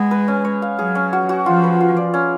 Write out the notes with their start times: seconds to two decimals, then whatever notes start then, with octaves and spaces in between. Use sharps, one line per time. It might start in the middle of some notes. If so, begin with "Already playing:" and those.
Already playing: G#3 B3
0.11 B4
0.28 C#4
0.45 C#5
0.62 F5
0.79 F#3 G#4
0.95 C#4
1.13 F#4
1.29 F#4
1.46 F3 F4
1.64 B4
1.80 F4
1.97 D5
2.14 C#4